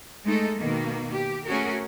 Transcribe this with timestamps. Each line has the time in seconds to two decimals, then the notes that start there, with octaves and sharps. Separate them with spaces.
0.25 G#3 A3 D#4 A4
0.57 B2 D#3 A#3
1.12 G4
1.46 A3 C#4 F#4 G#4 A#4